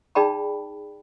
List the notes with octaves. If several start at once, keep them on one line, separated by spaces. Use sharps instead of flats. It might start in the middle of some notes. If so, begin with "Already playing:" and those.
D#4 G#4 D5 G5 A5 B5